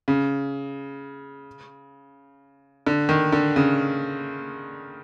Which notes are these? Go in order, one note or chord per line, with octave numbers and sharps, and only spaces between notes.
C#3
D3
D#3
D3
C#3